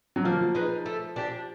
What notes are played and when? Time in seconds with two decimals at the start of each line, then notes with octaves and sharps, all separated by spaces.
0.16 F#3
0.25 F3 A#3
0.55 D#4 G#4 B4
0.86 A3
1.16 D4 G4